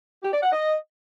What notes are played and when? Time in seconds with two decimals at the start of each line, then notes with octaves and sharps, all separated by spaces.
0.22 G4
0.32 D5
0.42 F#5
0.52 D#5